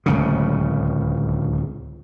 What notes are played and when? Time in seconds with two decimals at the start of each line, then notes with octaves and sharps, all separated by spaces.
0.06 D1 C#2 C#3